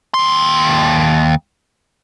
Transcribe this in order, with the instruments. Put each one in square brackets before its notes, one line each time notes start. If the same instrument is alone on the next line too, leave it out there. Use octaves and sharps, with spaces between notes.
[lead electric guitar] D#2 C6